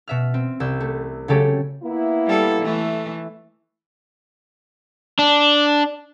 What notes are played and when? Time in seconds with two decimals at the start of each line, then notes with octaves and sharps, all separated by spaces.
0.08 B2 E5 F6
0.34 C4
0.60 C2 E6 G6
0.80 A3
1.28 C#3 F#3 A3 G4 A4 C#5
1.83 A#3 B3 E4
2.27 G3 A4
2.62 E3 A3
5.19 D4